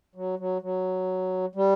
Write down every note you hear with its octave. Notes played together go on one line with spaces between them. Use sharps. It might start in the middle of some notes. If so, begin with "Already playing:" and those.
F#3
F#3
F#3
G3